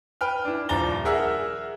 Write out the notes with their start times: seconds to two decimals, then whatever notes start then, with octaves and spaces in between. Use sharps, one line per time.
0.21 B4 G5 F6
0.45 D4 E4
0.69 D#1 F3 D4 A#5 A6 G7
1.05 G#4 A#4 E5 F#5 E6 F6